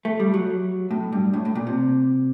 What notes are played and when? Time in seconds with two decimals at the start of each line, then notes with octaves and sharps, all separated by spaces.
0.05 A3
0.20 G3
0.34 F#3
0.91 A2
1.12 G2
1.34 A2
1.45 A2
1.55 A#2
1.67 C3